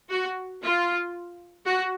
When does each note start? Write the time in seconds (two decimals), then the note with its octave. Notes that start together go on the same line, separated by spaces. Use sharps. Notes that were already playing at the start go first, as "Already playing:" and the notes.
0.10 F#4
0.62 F4
1.65 F#4